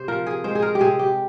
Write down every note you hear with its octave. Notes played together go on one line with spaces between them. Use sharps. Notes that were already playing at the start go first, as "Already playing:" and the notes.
Already playing: C3 C5
F3 A#4
G#4
G#3 C5
G#4
A#4
G4
C3 G#4
G4